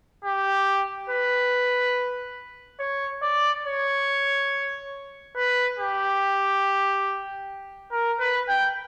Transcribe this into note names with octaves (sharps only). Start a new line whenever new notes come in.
G4
B4
C#5
D5
C#5
B4
G4
A#4
B4
G5